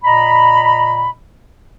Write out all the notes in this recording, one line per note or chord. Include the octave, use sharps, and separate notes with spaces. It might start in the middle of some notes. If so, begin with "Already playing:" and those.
A#2 D#5 A#5 B5